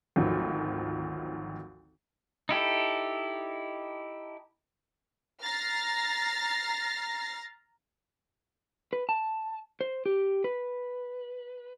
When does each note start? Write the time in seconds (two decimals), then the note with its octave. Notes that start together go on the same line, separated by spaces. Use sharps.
0.16 G#1 D2 D#3 F3 F#3
2.49 D#4 E4 G4 A4
5.42 A#5 F6 A6 A#6 C7
8.93 B4
9.09 A5
9.81 C5
10.06 G4
10.44 B4